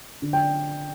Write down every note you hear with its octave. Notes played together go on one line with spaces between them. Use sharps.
D3
G5